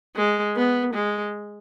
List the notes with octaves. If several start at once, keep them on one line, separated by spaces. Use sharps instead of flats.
G#3
B3
G#3